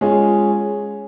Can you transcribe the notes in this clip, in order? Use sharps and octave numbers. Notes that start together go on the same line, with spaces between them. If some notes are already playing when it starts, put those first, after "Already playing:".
G#3 C#4 F4 G#4